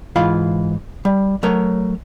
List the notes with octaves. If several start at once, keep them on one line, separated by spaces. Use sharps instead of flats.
G#2 E3 F4 F5 B5
G3
F#3 A3 A#4 C#5